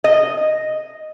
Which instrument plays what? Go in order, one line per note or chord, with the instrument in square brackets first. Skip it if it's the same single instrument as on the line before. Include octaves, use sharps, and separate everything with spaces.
[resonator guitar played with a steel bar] D#5